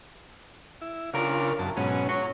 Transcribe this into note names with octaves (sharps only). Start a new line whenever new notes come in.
E4
B1 C#3 D4 F4 A#4
C2 F#2 A5
G#2 B2 F#3 C#4
C#4 F#4 C#5